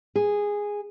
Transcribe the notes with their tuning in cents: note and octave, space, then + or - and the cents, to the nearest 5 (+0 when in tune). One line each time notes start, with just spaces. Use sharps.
G#4 -10